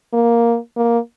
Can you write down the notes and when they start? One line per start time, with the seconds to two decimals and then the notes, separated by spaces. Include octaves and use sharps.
0.14 A#3
0.76 A#3